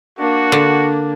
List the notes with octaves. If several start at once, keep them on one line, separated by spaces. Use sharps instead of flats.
A#3 D4 F#4
D3